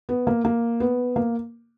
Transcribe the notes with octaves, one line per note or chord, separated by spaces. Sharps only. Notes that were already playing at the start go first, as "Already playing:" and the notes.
B3
A#3
A#3
B3
A#3